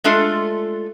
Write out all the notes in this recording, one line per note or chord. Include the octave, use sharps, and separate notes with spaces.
G#3 A3 D4 F4 A4